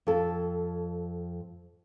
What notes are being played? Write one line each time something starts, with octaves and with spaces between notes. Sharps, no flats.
F2 A4